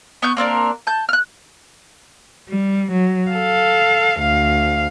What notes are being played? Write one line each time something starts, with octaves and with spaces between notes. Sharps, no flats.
B3 C#6 G6
A#3 C4 D4 A#4
A5 G6
F6 F#6
G3
F#3
A4 F5
D2 F5